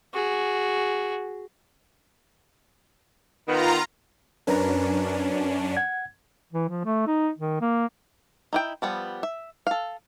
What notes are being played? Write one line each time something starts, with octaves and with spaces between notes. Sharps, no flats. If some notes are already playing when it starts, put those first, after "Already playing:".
F#4 G#4
D#3 B3 F4 A#5
F#2 C#4 D4 A#4 B4 A#5
F#5 G#6
E3
F3
A3
D#4
D#3
A#3
D#4 E4 G5
F3 G3 B3
E5
A4 F5